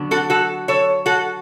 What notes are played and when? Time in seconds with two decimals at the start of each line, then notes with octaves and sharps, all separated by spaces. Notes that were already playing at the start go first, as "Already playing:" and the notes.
Already playing: D3 F#3 B3 D4
0.11 F#4 A4
0.30 F#4 A4
0.68 A4 C#5
1.06 F#4 A4